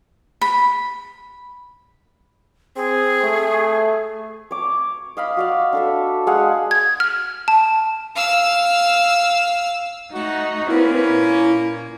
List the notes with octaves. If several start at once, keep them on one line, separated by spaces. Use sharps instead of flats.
B5
C4 G#4
A3
C#5 D6
D#5 F5 B5
F#4 D5 F5
D4 A4 E5
G#3 G#4 F5 F#5
G#6
F6
A5
F5 E6
A3 D#4 F#4
A#3 C4 C#4 E4 B4
A#2